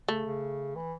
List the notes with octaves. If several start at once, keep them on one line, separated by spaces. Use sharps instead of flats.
C#3 A3
C#3
E3